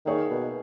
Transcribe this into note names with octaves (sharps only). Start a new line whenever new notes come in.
D#3 A#3 D#4 G#4 C#5 E5
B2